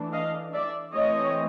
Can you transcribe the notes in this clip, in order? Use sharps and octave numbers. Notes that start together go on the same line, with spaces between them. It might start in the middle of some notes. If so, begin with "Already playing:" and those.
Already playing: E3 A3 D4
D#5 F5
D5 E5
E3 A3 C4 C#5 D#5